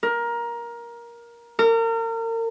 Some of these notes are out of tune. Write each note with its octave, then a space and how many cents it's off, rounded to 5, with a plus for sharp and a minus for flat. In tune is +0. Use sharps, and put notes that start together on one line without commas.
A#4 +15
A#4 -35